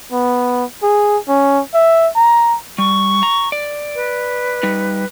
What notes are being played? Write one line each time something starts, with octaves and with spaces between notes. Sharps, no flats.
B3
G#4
C#4
E5
A#5
G3 C#6
A#5
D5
B4
G3 D#4